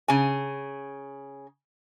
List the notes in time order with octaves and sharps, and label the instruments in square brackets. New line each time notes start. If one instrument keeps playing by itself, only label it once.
[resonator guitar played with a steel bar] C#3 G#5